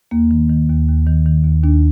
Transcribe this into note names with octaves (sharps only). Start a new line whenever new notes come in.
D#2 A#3
D#3
D#3
D#2
D#2
D#3
D#3
D#2
D#2 D4